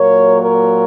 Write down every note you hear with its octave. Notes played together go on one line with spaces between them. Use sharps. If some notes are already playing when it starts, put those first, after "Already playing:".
Already playing: A#2 F#3 A#3 A#4 C#5
A#4 C#5